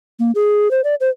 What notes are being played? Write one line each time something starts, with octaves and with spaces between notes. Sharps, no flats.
A#3
G#4
C5
D5
C5